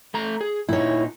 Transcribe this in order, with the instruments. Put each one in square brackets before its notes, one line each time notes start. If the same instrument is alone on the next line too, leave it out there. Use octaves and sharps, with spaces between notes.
[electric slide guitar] A3 A#5
G#4
[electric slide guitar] A#2 D#4 [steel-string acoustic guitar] E4 C#5